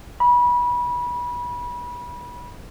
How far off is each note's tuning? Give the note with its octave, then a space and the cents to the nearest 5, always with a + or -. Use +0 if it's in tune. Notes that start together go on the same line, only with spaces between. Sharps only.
B5 -25